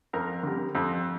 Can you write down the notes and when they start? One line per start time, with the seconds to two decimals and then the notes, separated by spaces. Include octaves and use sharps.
0.13 F2 A#4
0.43 D3 G3
0.75 F2